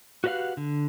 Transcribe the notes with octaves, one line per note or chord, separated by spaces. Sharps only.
F#4 G4 B4 D#5 F5 F#5
D3